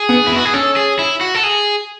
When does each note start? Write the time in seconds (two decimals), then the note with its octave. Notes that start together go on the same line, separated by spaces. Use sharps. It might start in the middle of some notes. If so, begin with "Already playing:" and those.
Already playing: G#4
0.09 B3
0.27 E4
0.32 B3
0.36 F#4
0.45 G#4
0.54 C#4 A4
0.76 G#4
0.99 E4
1.21 F#4
1.35 A4
1.43 G#4